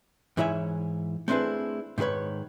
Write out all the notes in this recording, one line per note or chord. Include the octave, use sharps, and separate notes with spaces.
G#2 E3 E4 C#5 E5 G#5
A3 C4 D4 E4 G#4 B4
G#2 D#3 F4 B4 C#5